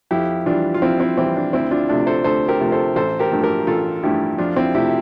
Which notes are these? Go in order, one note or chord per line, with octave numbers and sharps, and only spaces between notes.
F2 E4 G4
E3 G3 D4 F4
F4
F2 C4 E4
C4 E4
E3 G3 C4
D4
D2 C4 E4
D4 F4
C3 F3 A3 D4
A4 C5
D2 A4 C5
G4 A#4
C3 F3 A3
A4 C5
A1 A4 C5
G4 A#4
G2 F3 A3
G4 A#4
A1 F4 A4
G2 F3 A3 E4 G4
F2 D4 F4
C4 E4
C3 F3 A3 E4 G4